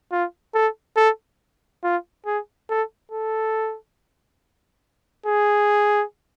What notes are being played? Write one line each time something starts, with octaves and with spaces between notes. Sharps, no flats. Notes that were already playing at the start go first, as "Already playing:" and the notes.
F4
A4
A4
F4
G#4
A4
A4
G#4